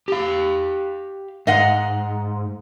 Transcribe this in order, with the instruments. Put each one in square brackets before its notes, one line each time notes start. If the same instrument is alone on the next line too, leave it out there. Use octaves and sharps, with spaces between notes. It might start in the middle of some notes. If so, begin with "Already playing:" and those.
[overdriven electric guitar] G4 F5
[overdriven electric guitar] G#2 [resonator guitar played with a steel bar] D#5 F5 F#5